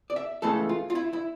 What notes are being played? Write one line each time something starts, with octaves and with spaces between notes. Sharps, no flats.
D5
E5
C#2 C#3 E3 A3 A4
F4
F4
E4
E4